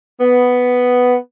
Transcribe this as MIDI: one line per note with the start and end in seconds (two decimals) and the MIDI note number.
0.20 1.15 59